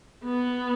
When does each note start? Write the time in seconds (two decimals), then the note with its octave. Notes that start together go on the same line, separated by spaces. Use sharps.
0.25 B3